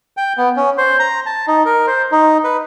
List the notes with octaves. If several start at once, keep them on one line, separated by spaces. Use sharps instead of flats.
G5
B3
C#4
C5
A#5
A5
D#4
A#4
C5
D#4
B4